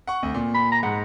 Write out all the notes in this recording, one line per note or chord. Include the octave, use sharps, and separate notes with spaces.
F#5 C#6
D2
A#2
B5
A#5
G#2 F#5